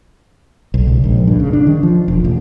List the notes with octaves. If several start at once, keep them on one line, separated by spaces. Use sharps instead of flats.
B1
C#2
A#1
G2
C#3
D4
D#3
F3
E1
A1